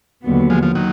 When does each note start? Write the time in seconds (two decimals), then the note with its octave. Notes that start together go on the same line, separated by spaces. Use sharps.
0.23 D#2 D3 F#3 B3
0.50 F3 G#3
0.63 F3
0.75 D#3 F#3